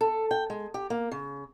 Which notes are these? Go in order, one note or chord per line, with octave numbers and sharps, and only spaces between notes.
A4
G5
G#3
G4
A#3
C#3